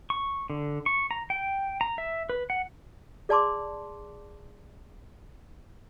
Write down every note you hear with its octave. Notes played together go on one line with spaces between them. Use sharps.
C#6
D3
C#6
A#5
G5
A#5
E5
B4
F#5
G#4 D5 A5 C6 D6